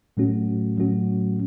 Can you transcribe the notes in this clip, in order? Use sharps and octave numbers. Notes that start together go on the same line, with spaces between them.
A2 F#3 A3 C#4 F#4
A2 F#3 A3 C#4 F#4